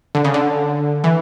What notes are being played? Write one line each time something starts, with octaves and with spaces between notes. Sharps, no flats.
D3
C#3
D3
E3